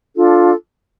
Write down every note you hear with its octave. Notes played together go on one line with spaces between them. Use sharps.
D4 F4 A4